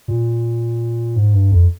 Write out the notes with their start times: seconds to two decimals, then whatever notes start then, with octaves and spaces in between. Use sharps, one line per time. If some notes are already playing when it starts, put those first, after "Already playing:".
0.08 A#2
1.16 G#2
1.33 G2
1.51 F2